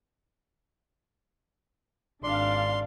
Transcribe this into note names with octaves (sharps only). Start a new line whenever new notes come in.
G#1 D4 D5 F5 C6